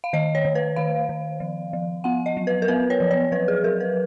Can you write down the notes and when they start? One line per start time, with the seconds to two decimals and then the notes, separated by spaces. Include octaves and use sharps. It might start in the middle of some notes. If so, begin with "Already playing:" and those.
0.04 F5
0.13 D#3 D#5
0.35 C#5
0.45 D#3
0.55 B4
0.76 D#3 F5
1.09 D#3
1.40 F3
1.73 F3
2.04 B3 F#5
2.26 D#5
2.37 F#3
2.47 B4
2.62 A#4
2.68 B3 B4
2.90 C#5
3.00 F3
3.11 C#5
3.32 F#3 B4
3.48 G#4
3.64 F#3 A#4
3.80 B4